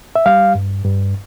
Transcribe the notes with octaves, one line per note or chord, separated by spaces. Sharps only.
E5
G3 F5
G2
G2